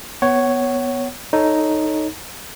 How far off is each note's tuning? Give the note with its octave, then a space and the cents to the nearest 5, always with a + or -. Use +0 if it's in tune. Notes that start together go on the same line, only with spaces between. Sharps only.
B3 +0 C#5 +0 F#5 +30
D#4 +0 A4 +0 C#5 +0